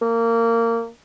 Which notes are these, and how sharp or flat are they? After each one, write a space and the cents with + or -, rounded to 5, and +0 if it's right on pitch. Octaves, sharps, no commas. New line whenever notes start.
A#3 -20